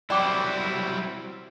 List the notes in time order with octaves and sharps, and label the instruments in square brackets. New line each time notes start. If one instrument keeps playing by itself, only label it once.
[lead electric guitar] F#3 G3 [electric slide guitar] C4 E4 [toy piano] D5 G5 D6